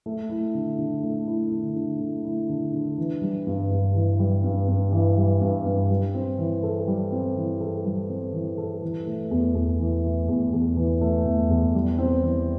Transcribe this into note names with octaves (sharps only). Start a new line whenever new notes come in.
A3
E4
D3
D3
A3
E4
D3
D3
A3
E4
D3
D3
E3
G3
G2
G2
E3
G3
G2
G2
E3
G3
G2
G2
G3
C4
E3
A4
G3
C4
E3
A4
G3
C4
E3
A4
E3
A3
E2
E2
E3
A3
E2
E2
E3
A3
E2
E2
G3
C4
E3